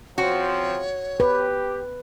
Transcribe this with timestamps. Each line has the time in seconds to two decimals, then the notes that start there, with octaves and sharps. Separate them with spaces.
0.18 C#3 F3 C4 F#4 C#5
1.20 G4 B4